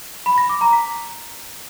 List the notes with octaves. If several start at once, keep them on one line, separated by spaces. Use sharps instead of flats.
B5
A#6
D6
A#5
B6